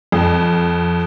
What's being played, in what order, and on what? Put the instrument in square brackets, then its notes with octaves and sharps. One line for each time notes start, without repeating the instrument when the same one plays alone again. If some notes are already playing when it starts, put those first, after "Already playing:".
[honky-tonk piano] F2